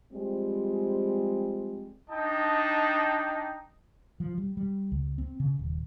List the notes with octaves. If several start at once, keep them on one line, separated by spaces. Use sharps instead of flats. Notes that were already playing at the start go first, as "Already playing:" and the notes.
F3 G3 G#3 C4
D4 D#4 D#5 G5 A5
F3
G3
G3
C#2
C4
C#3
D#1